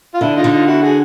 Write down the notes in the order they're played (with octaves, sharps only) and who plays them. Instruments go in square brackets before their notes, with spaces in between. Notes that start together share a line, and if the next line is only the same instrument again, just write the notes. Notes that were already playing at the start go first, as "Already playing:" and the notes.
[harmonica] F4
[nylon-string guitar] D3 [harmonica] D4 E4
[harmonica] D#4 F4
[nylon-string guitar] D3
[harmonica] D#4 F4
E4 F#4
F#4 G#4